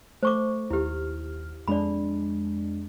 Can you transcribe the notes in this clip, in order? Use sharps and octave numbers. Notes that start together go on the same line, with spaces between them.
A3 C5 C#6 D6
D#2 E4 G4 F6
F2 G#3 D4 D5 B5